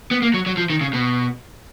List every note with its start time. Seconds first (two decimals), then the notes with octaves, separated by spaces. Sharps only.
0.11 B3
0.22 A#3
0.34 F#3
0.46 F#3
0.57 F3
0.70 D#3
0.81 C#3
0.93 B2